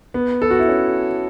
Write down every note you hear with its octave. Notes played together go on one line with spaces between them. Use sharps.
B3
A4
F#4
E4
C#4